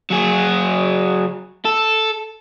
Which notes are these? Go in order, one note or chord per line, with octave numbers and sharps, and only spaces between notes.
F#3 G#4
A4